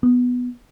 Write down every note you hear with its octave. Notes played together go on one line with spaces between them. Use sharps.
B3